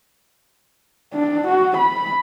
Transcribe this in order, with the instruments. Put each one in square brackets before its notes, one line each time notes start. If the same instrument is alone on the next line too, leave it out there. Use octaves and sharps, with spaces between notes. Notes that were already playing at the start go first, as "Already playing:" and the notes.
[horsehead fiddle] D4
F#4
B5